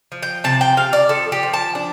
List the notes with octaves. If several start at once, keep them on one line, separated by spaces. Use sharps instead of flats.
F3
G5
C3 A5
G5
C3 F5
D5
F3 A4
G4
F3
A5
D4